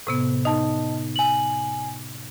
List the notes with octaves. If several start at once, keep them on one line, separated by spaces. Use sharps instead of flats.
A2 C3 B3
D#4 D#5 A5
G#5 F#7